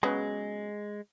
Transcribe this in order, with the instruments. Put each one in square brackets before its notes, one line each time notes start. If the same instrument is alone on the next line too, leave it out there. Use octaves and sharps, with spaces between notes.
[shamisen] C#3 F#3 B3 [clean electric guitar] G#3